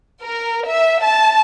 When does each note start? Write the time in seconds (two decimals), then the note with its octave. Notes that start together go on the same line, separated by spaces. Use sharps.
0.22 A#4
0.66 E5
1.03 A5